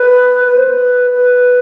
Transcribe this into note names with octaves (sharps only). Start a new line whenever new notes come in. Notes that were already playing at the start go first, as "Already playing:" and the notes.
Already playing: B4
B4
C5
B4
B4